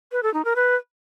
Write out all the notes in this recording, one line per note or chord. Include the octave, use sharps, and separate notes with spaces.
B4
A4
D#4
A#4
B4